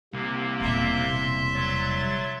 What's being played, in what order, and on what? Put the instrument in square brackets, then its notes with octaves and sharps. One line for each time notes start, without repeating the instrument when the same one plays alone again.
[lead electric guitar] C2 [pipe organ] C3 A#3
[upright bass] E1 A#2 [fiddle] E5 C6
[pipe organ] F#3 A6